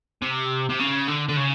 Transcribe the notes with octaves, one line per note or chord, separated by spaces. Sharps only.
C3
C3
C#3
D3
D3
C#3